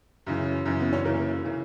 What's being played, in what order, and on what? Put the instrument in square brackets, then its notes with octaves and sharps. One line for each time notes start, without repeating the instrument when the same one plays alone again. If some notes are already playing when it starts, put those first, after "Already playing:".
[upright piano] F#2 C#3 E3
F#2 C#3 E3
B3
C#4
F#2 C#3 E3 A#3
C#3 E3